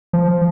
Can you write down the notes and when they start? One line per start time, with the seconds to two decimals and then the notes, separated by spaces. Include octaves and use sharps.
0.13 F3